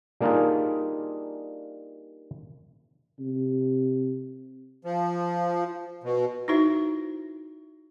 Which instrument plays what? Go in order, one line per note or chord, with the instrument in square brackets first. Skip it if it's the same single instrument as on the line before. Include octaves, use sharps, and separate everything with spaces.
[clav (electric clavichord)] G3 A#3 D4 D#4 F4 G#4
[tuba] C3
[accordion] F3
B2
[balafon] D#4 E4 F#4 C5 E5